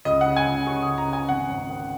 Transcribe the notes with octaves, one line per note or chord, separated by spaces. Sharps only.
C#2 D#5
F#5
C#3
G#5
C#2
C#3 C#6
D#6
C#2
A#5
C#3 G#5
G#1 F#5
G#1
D#3